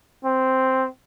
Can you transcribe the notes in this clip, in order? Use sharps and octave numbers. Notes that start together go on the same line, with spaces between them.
C4